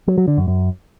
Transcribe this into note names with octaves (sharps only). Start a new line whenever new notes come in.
F#3
F#3
D3
F#2
F#2